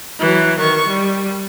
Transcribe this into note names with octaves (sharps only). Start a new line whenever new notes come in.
E3 F#3
D#3 C#6
G3